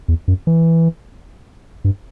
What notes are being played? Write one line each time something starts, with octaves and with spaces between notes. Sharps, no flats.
E2
F#2
E3
G2